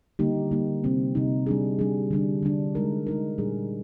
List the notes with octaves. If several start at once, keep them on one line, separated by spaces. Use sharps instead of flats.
D3 G3 A#3 D#4 G4
D3 G3 A#3 D#4 G4
C3 G3 C4 D#4
C3 G3 C4 D#4
G3 D4 G#4
G3 D4 G#4
D3 G3 D4
D3 G3 D4
G#3 D#4 A#4
G#3 D#4 A#4
A#2 G3 D4 G#4